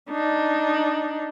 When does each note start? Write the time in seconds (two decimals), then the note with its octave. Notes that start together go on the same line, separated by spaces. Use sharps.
0.10 D4 D#4